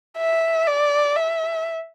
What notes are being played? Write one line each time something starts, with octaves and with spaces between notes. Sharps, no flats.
E5
D5
E5